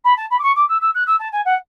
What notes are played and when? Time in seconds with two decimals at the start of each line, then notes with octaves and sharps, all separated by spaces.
0.04 B5
0.16 A5
0.30 B5
0.38 D6
0.42 C#6
0.55 D6
0.68 E6
0.81 E6
0.94 F#6
1.06 E6
1.19 A5
1.32 G#5
1.45 F#5